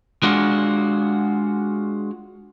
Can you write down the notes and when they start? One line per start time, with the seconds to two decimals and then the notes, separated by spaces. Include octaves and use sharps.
0.23 G#3 D4 F4 F#4